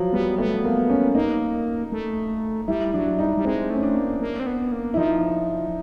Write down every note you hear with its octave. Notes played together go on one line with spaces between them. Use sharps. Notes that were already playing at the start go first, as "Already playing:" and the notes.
Already playing: F3 F#3
G3 B3
A3 B3
A#3
C#4
A#3 D#4
A3
G3 E4
F#3 D4
G3 D#4
G3
G#3 C4
A3 C#4
D4
A#3
A#3
C4
B3
A#3
E4
F3 D#4